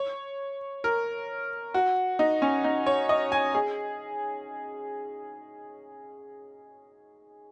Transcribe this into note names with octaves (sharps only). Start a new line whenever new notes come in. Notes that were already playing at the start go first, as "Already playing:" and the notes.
Already playing: C#5
A#4
F#4
D#4
C#4
D#4
C#5
D#5
G#5
G#4